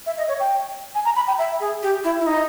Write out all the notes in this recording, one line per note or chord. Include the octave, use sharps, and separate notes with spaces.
E5
D#5
C#5
G5
G#5
A#5
B5
G5
E5
G#4
G4
E4
E4
D#4